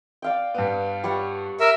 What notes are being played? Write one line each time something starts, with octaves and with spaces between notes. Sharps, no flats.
D5 F5 G5
G2 B3
G3 C#5 F#5
A#4 E5